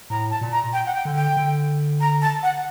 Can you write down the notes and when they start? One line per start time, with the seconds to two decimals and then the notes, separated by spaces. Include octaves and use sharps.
0.10 A2 A#5
0.30 A5
0.41 A#2
0.52 A#5
0.73 G5
0.86 F#5
0.94 G5
1.05 D3
1.16 G5
1.37 D3
2.00 A#5
2.22 A5
2.43 F#5